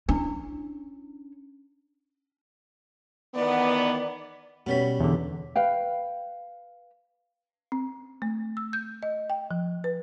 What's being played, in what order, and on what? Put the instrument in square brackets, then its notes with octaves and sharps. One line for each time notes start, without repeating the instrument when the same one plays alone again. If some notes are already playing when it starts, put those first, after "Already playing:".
[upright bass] C#4 [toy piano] D4 E4
[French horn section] D#3 E3 B3 [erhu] D5
[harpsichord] B2 G3 B5 [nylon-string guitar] B3 C#4
[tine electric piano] E2 D3
[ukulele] B4 F5 G5
[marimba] C4
A3
E6
G6
D#5
G5
F3
B4